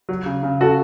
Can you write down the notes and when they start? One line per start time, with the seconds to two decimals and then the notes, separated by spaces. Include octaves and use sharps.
0.09 F#3
0.26 C#3
0.43 C#3
0.61 C#3 F#4 A4